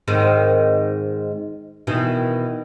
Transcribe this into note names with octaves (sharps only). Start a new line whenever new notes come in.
G#2 D#3 C4
B2 D#3 E3